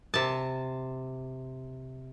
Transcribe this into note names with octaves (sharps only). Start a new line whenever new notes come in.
C3 A5